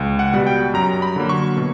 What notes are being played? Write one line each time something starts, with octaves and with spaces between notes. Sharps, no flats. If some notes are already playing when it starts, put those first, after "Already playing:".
Already playing: C#2
F#5
B2 G3
G5
F#2 A#5
B5
D3 F#3 A#3
C#6
B2